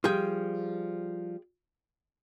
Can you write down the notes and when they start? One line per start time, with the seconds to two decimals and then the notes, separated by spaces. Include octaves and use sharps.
0.04 F3 G3 F4 G#4 G5